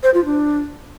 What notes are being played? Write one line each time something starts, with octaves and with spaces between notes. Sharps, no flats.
C5
F4
D4